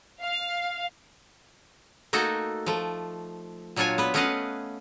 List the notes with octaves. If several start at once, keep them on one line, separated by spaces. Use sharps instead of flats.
F5
A3 A#3 D#4 F#4 A4
F3 A3
A#2 F#3 D4 F4 C#5 G#5
B3 B4
A3 C#4 B4 D#5 F5 F#5